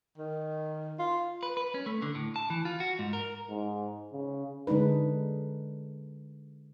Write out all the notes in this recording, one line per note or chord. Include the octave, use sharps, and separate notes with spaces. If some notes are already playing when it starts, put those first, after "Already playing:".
D#3
F4
B4
B4
C#4
A3
D3
A2
A5
E3
F4
F#4
G#2
A#4
G#2
C#3
D3 G#3 D4 D#4 B4